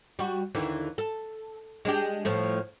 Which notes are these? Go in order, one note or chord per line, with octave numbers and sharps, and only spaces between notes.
G3 F#4
D#2 D3 E3
A4
G#3 D4 G4
A2 F3 A3